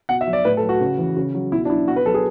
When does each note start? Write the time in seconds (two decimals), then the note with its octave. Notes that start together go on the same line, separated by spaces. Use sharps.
0.09 B2 F#5
0.21 E5
0.27 F#3
0.33 D5
0.45 A2 B4
0.57 A4
0.63 F#3
0.69 F#4
0.80 C#3
0.98 E3
1.17 C#3
1.34 F#3
1.52 B2 E4
1.65 D4
1.70 F#3 E4
1.88 B2 F#4
1.96 B4
2.06 F#3 A4
2.14 G#4